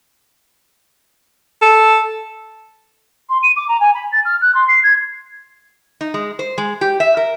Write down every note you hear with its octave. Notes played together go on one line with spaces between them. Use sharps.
A4
C6
D#7
D6
A#5
G#5
B5
A6
F6
F#6
C6
C7
G#6
D#4
G#3
C5
G#3
G4
E5
A#4